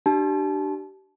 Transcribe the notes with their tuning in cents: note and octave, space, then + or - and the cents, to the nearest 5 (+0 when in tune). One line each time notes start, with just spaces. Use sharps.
D4 +20 G4 -30 A5 -30